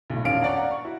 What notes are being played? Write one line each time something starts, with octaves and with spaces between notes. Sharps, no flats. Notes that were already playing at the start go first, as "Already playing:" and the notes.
B1 A2
E1 A#1 D#3 C#4 F5 D7
C#5 D5 F#5 A#5
F5 F#5 A#5
C#6
E4 F#4